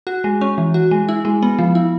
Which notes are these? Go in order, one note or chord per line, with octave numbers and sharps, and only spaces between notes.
F#4
G#3
C#4
E3
F#4
G#3
E4
G#3
B3
F3
E4